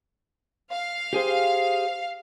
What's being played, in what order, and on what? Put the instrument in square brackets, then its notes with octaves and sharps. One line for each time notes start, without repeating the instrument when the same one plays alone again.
[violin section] F5
[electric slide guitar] G4 G#4 C5